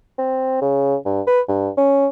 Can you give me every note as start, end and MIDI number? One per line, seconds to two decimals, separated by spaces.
0.18 0.61 60
0.62 0.96 49
1.06 1.22 43
1.27 1.41 71
1.48 1.69 43
1.77 2.08 61